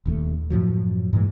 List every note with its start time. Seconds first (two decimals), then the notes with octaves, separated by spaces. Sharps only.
0.06 D#1 D#2 C#3 A3
0.50 F#2 A2 F3 F#3
1.13 G2 A#2 E3 G#3